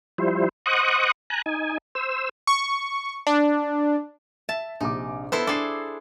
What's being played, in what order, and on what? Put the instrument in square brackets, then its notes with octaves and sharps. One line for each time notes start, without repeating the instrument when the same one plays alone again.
[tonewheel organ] F3 G3 E4 C5
C5 D#5 F#5 C#6 D#6 F#6
G#5 A#5 F#6
D#4 G#5
C5 E6
[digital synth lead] C#6
D4
[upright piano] E5 [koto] A5
[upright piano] A#1 C3 D6 [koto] D#4
[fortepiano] B3 [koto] E4 A4 C5
[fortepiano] D4 [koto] G#4 A4 [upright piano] D6 C7